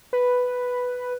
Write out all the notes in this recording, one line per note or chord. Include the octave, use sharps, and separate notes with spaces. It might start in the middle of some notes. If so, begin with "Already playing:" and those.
B4